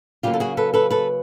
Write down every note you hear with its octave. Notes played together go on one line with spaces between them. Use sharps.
C#3 F#3 A#3 F4 G4
A4
F#4 G#4
A4 B4
A4 B4
A4 B4